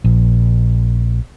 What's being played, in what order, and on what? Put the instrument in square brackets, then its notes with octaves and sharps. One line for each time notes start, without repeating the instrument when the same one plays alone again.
[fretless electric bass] A#1